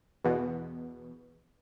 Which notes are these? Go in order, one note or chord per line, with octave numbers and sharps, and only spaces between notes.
E2 B2